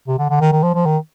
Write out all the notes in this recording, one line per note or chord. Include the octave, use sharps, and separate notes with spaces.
C3
D3
D3
D#3
D#3
F3
F3
D#3